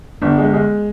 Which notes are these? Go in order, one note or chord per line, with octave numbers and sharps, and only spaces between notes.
G1 D4
G#3
G#3